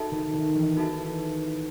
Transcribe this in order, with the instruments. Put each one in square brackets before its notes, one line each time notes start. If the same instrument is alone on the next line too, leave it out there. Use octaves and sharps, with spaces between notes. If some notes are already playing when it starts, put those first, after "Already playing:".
Already playing: [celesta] D#4 F#4 A4 E5 A5
[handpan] D#3
D#3
E3
[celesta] D#4 F#4 A4 E5 A5